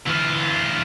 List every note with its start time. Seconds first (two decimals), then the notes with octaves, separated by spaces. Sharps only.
0.06 E3 F4